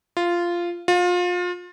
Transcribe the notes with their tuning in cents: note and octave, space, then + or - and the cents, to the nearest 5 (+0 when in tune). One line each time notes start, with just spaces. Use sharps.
F4 -10
F4 +30